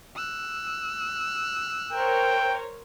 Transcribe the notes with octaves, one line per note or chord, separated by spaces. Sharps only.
E6 F#6
A#4 C5 C#5 G5